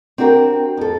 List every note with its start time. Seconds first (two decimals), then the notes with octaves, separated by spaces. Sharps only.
0.18 C4 D4 F#4 G4 A#4
0.77 F2 A4